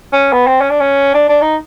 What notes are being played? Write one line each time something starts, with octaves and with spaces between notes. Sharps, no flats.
C#4
B3
C4
C#4
D4
C#4
D4
D4
D#4